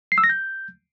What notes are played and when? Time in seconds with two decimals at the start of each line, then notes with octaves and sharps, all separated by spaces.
0.12 C7
0.18 E6
0.24 A#6
0.29 G6